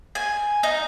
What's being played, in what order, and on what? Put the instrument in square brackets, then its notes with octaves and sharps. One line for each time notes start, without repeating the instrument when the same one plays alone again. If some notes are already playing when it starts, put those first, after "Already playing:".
[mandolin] G#5
D#4